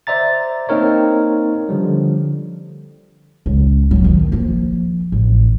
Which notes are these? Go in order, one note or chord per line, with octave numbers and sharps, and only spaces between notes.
C5 D5 E5 A#5 A6
A#3 C4 D#4 A#4 C#5
D3 F3 G3
C#2
D1 F#3
D#3
F3 A#3
A1